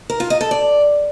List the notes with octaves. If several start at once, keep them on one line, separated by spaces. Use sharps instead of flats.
A#4
F4
D#5
A4
D5